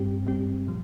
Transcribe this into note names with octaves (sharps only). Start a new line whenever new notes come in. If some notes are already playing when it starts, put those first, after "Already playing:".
Already playing: G2 G3 C4 G4
G2 G3 C4 G4
A#2 F3